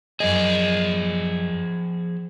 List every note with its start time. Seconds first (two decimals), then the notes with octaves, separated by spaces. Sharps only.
0.20 F#2 F3 G#4 D#5